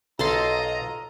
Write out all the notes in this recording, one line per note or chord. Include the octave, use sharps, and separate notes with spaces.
B1 F4 A4 D#5 A5 A#5 C6